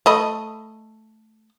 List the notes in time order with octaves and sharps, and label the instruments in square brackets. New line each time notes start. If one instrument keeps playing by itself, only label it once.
[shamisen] A3 D#5 B5